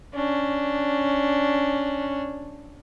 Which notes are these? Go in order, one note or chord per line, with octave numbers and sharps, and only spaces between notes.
C#4 D4